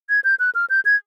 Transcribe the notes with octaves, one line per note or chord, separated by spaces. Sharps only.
G#6
G6
F#6
F6
G6
G#6